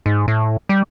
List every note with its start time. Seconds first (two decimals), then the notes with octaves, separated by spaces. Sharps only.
0.06 G#2
0.28 A2
0.69 G3